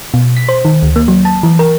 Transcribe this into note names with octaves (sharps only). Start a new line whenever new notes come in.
B2
B6
C5
D#3
D2
A#3
F#3
A5
E3
A#4